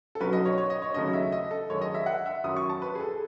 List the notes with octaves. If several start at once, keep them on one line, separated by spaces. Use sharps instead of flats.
A4
B1 B2 F#3 C#4 B4
D#5
C#5
C#5
D#5
C#5
D#2 C#3 F#3 A3 C#4 D#5
E5
D#5
A4
F#2 D#3 G#3 C#5
D#5
E5
F#5
E5
F#2 D#3 F#3 C#4 D#6
C#6
A5
B4
G#4
A4